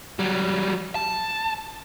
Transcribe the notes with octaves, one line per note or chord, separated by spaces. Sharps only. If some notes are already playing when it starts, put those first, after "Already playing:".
F#3 G3
A5